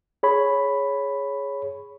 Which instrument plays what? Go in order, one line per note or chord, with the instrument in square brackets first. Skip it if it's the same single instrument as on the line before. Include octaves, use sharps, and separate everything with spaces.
[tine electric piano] G#4 C#5 B5